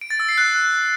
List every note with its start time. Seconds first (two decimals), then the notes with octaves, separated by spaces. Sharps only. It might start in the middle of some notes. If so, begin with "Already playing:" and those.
0.01 D7
0.10 A6
0.20 E6
0.29 C7
0.38 F#6